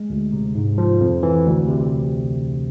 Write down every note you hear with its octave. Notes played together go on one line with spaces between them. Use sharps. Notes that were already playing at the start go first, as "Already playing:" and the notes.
Already playing: G#3
D2
C3
G#2
F3
F2
E3
D2
C3